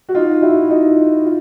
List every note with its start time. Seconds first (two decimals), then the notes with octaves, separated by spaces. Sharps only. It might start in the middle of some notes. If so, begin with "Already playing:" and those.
0.09 F#4
0.15 D#4 F4
0.42 E4 F#4
0.69 D#4 F4
1.25 F4